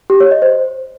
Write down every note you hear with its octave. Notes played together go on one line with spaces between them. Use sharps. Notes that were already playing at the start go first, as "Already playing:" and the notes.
G4
C#5
D#5
C5